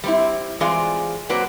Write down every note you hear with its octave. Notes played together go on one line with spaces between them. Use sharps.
G3 C4 E4
E3 G#3 C4 F4 G#4 D5
F#3 A#3 C4 F#4 B4 D5